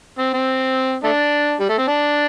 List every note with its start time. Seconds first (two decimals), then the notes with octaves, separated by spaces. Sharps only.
0.19 C4
0.33 C4
1.04 A3 D4
1.60 G3
1.69 A3
1.78 C4
1.88 D4